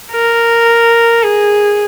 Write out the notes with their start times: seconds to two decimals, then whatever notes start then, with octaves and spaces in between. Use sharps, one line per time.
0.12 A#4
1.22 G#4